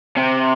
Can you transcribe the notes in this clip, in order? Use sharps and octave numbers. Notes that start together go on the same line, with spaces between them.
C3